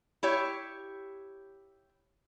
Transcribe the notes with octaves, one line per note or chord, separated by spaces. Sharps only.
E4 G4 C#5